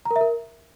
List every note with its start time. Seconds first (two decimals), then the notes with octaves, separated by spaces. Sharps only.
0.05 A#5
0.11 A#4
0.16 E5
0.21 A#4